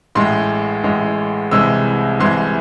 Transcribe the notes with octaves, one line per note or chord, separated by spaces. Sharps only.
A1 A2 G#3 C6
A1 A2 G#3
C2 C3 E3 G#3 E6
C2 C3 E3 G#3 C6